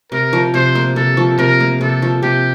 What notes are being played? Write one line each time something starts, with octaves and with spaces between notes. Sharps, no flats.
C3 A#4
F3
C3 C5
A#3
C3 A4
F3
C3 A#4
A#3
C3 A4
F3
C3 G4